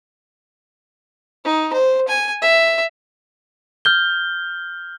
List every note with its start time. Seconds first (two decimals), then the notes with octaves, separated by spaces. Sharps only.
1.45 D#4
1.73 C5
2.08 G#5
2.42 E5
3.85 F6 G6 G7